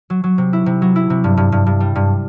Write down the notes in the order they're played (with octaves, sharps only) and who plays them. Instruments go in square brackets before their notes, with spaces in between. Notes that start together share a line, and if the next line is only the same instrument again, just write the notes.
[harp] F#3
F#3
C3
E4
C3
F#3
E4
C3
G2
G2
G2
G2
G3
G2